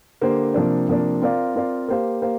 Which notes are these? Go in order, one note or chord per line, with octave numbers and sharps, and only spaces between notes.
D3 A#3 G4 C5
C3 F3 A#3 D4
C3 F3 A#3 D4
C4 F4 A#4 D5 F5
C4 F4 A#4 D5 F5
A#3 G4 C5 F5
A#3 G4 C5 F5